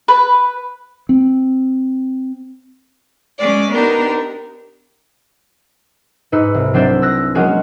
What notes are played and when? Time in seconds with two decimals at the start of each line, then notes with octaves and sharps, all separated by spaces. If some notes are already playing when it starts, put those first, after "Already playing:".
0.08 B4
1.09 C4
3.39 G#3 C#4 D5
3.72 B3 D4 D#4 G4 A#4
6.32 G#2 D#4 B4 E6 C#7
6.54 C2
6.74 F#3 C4 D4 C5 D5 E5
7.02 E6 F#6 A#6
7.35 F#3 G#3 A#3 C#4 F#4 G#4